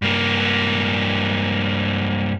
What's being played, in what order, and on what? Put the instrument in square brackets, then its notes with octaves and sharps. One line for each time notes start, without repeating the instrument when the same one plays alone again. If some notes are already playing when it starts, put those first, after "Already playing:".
[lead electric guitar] G2 A#3